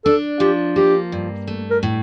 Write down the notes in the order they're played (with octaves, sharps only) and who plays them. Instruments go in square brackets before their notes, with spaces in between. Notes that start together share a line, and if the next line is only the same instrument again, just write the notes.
[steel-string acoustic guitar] D4 [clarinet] A4
[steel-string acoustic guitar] F3 [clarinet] G4
[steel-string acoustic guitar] A#3 [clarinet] G4
[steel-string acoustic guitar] G2
A3
[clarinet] A#4
[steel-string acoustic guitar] A2